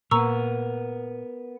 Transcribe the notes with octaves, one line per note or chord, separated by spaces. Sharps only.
A#2 A#3 B3 A#4 A#5 C#6 E6